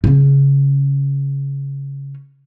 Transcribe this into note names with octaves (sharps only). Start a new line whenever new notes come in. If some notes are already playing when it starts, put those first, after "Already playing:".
C#3 C#4